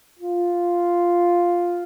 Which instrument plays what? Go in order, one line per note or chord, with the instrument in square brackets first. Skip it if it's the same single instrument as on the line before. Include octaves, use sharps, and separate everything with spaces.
[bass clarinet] F4